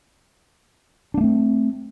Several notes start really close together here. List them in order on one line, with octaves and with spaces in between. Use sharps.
D4 A#3 A3 C4